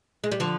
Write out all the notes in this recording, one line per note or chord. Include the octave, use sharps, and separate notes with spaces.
G#3
G3
D3 F3